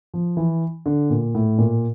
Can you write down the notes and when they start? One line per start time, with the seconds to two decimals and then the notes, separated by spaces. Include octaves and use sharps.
0.14 F3
0.37 E3
0.86 D3
1.10 A#2
1.35 A2
1.58 A#2